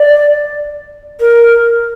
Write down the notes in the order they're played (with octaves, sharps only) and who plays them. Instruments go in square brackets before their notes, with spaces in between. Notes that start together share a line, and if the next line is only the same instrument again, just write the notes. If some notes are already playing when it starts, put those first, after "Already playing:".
Already playing: [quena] D5
A#4